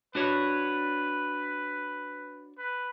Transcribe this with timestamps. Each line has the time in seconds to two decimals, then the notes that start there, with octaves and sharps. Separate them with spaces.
0.15 D4 F#4 B4 C#5
2.58 B4